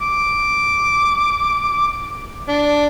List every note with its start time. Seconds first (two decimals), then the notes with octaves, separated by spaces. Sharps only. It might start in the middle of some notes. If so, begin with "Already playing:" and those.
0.02 D6
2.49 D4